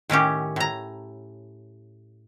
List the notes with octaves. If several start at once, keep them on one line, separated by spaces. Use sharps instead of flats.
A2 D#3 C#4 G4
A2 A#5